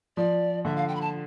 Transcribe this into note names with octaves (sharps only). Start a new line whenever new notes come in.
F3 D5
D3 E5
F5
G5
B5
A5